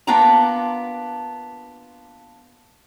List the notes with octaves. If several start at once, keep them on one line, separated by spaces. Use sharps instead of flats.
A#3 B3 D4 F4 G5 A#5